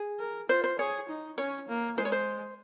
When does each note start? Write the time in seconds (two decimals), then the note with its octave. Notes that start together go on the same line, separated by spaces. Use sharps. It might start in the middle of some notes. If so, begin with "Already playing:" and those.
Already playing: G#4
0.19 A#4
0.49 F4 C5
0.64 C5
0.79 G#4 C#5
1.08 D#4
1.38 C#4 C#5
1.68 A#3
1.97 G#3 C5
2.05 C#5
2.12 C5